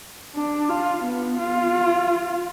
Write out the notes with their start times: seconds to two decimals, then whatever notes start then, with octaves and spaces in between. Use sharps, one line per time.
0.35 D4
0.69 F4
1.04 B3
1.39 F4